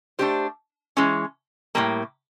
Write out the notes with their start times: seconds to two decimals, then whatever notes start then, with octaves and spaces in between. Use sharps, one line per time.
0.19 A3 D4 G4 C5
0.97 E3 G#3 C#4
1.75 A2 E3 G3 A#3